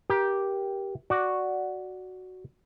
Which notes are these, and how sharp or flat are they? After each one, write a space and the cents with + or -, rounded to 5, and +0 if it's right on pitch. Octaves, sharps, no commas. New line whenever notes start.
G4 +0 A#4 +25
F#4 +0 D5 +0